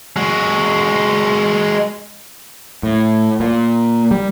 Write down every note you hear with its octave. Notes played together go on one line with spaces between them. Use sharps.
G#3 F#4
A2
A#2
G3